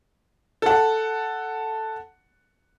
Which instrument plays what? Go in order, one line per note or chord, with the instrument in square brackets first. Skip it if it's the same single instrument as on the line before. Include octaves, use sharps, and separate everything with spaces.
[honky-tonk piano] A4 F#5